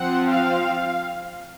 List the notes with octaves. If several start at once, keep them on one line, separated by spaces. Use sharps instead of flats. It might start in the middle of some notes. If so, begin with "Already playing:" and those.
Already playing: F3 C4 F#5
F5